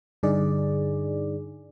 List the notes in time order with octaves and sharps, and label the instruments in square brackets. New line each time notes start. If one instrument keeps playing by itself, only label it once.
[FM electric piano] G2 D3 D#4 G#4 D5